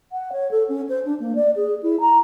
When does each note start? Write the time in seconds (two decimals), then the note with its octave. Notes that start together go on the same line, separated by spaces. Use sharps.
0.12 F#5
0.33 C#5
0.51 A4
0.69 C#4
0.89 C5
1.05 D4
1.20 A#3
1.35 D5
1.56 G#4
1.83 E4
2.01 A#5